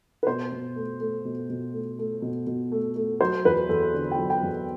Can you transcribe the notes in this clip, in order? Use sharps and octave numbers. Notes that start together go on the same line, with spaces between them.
B4
B2 C5
B2
A3
A3
B2
B2
A3
A3
B2
B2
A3
A3
F#3 C5
E2 B4
E2 A4
D3
G5
F#3
G5
E2